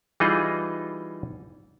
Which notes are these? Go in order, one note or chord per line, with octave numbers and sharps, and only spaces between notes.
E3 G3 D#4 F4 G#4 D#5